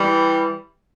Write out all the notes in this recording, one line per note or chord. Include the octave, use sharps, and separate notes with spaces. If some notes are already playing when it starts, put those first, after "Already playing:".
Already playing: E3 G3